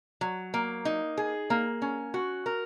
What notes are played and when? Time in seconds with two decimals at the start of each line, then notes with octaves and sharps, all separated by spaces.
0.21 F#3
0.54 A#3
0.85 D#4
1.18 G#4
1.50 A#3
1.82 C#4
2.14 F#4
2.46 A#4